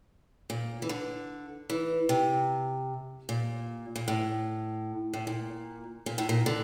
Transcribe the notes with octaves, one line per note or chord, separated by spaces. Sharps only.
A#2
E3
D3
E3
C3
A#2
A#2
A2
A2
A#2
A#2
A2
A#2
D3